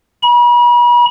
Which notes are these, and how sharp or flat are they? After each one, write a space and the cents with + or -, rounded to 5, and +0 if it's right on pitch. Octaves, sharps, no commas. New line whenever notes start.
B5 -40